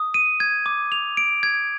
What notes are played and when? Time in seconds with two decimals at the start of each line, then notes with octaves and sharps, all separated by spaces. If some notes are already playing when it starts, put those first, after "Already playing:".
Already playing: D#6
0.14 D#7
0.40 G#6
0.66 D6
0.92 F7
1.17 D7
1.43 G#6